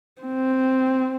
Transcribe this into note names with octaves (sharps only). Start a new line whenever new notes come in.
C4